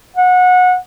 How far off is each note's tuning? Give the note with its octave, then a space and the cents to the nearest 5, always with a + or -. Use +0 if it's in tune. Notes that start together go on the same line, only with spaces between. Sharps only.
F#5 -25